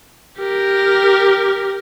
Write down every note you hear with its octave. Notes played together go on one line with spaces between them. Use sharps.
G4 A#4